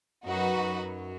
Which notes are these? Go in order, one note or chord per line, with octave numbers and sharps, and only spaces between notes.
F#2 F#3 D#4 F#4 B4
F#2 F#3